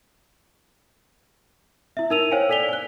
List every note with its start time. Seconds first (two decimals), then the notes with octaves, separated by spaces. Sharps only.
1.97 E4 E5
2.10 D#4 A#4 E6 D#7 F7
2.32 C5 C#5 F5 G5 G#5
2.49 A4 D5 B6 F7 G7
2.69 G#5 F#6